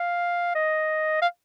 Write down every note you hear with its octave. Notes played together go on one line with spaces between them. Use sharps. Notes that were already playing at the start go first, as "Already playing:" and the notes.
Already playing: F5
D#5
F5